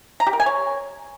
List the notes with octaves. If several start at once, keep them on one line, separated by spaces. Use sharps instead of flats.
A#5
G4
A#4
G#5
C#5